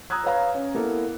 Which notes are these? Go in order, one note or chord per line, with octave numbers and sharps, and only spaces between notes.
A#5 D#6 E6 F#6 G#6
B4 C#5 F5 A#5
C#4
A#3 B3 E4 A4 A#4